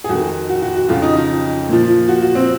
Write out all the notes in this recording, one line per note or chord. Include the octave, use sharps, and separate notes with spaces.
G#4
F2 D#3 F#4
F#4
F#4
F#4
F2 C#3 F3 F4
D#4
D#4
A#2 F3
F#4
F#4
C4